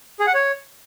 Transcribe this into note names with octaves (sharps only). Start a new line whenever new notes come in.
G#4
F#5
C#5